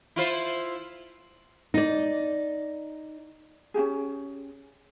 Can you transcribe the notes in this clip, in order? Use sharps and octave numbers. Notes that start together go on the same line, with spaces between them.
E4 F4 C5
D#4 D5
C#4 D#4 G4 G#4